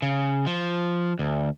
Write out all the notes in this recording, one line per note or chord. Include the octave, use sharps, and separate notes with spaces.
C#3
F3
D2